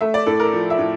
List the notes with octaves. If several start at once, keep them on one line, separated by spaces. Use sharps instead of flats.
A3 E5
D5
A2 A4
A#4
F3
E5
A2